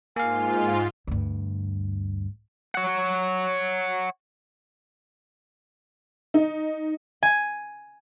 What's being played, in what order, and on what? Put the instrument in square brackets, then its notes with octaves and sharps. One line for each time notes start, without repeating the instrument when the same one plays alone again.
[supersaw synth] G#2 F4 [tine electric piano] A#3 F5 [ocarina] G#5
[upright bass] D2 G2
[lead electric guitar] C#5 F#5
[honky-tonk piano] D#4
[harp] G#5